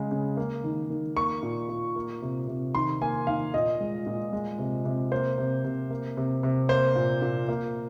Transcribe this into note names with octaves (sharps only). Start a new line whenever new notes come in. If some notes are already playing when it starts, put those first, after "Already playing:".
Already playing: C#3 G#3
C#3
A#3
D#3
D#3
A#3 C#6
A#2
A#2
A#3
C3
C3
D#3 C6
A#3 G#5
D#3 F5
A#2 D#5
G#3
A#2
G#3
C3
C3
A#3 C5
C3
C3
A#3
C3
C3
A#3 C5
A#2
A#2
A#3